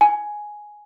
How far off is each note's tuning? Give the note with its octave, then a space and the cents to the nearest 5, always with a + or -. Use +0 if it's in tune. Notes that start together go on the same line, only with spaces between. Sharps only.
G#5 +5